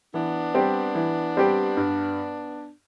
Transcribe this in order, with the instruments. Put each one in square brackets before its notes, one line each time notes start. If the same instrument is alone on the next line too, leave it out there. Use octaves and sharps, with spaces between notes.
[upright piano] E3 [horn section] B3 D4
[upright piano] G3 C4 G4
E3
G3 C4 G4
G2